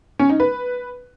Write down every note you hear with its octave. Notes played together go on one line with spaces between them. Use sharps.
C#4
D#4
B4